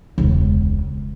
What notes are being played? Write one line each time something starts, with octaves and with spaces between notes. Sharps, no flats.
E1 C#2